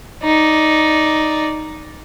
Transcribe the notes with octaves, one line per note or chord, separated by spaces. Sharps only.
D#4 D5